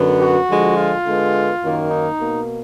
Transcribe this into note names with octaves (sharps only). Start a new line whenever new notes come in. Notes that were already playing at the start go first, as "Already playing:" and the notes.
Already playing: F#2 D3 F#3 B3
F#4
D3 F3 G#3
F4
D3 G#3 B3
F#2 D#3 F#3 A#3
D#4
B2 A#3